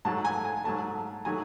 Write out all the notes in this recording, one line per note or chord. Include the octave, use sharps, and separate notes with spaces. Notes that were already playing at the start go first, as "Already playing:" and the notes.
G#2 F#3 A3 A5
G#5
G#5
G#2 F#3 A3 A5
D#3 F#3 A3 G#5